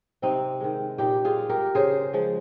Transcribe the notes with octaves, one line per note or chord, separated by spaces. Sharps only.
C3 C4 D#4
D#3 G#3
A#2 D#4 G4
F4 G#4
G#3
G4 A#4
C#3 G#4 C5
F3 G#3